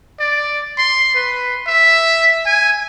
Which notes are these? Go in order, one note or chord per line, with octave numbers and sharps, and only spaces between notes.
D5
C6
B4
E5
G#5